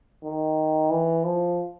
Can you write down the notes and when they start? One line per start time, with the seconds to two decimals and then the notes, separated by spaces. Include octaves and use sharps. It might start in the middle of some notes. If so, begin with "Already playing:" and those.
0.23 D#3
0.91 E3
1.24 F3